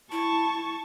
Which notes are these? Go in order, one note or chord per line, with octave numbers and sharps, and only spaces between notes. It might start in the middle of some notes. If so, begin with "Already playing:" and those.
E4 A5 C#6